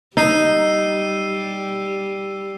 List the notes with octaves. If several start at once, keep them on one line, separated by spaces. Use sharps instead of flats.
G3 D#4 E6 C7 D#7